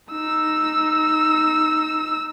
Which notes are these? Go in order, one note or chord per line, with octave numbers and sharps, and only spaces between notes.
D#4 E6